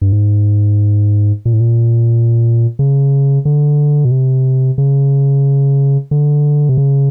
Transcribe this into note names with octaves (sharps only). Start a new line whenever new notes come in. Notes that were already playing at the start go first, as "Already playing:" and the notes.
G2
G#2
A#2
A2
A#2
C#3
D3
B2
C3
C#3
D3
C3
C#3